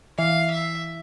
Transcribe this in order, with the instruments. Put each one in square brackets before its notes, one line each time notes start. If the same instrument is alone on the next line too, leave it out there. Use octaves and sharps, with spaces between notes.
[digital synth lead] E3 [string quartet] F5
[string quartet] E5